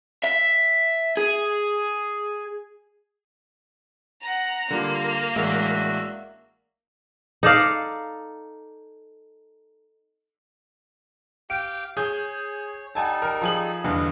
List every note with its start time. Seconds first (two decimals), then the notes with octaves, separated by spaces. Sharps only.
0.24 E5
1.17 G#4
4.22 F#5 A#5
4.71 D3 G3 A#3 F4
5.36 A1 G#3 D4 F#4 E5
7.43 D#4 A4 D5 F5
11.50 G4 F5 G5 D7
11.97 G#4 C#5 G6
12.95 G3 D#4 A4 F#5 G#5 A5
13.22 A#4
13.42 F3 G#4 F#7
13.84 E2 G2 D3 D#5 F5